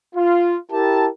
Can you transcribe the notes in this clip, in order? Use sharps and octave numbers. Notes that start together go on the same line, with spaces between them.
F4
E4 G4 A#4 A5